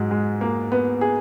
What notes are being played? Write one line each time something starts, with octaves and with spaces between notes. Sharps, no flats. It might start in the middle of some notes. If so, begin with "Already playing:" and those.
Already playing: G#2 F#3 G#3
G#3
A#3
B3
G#4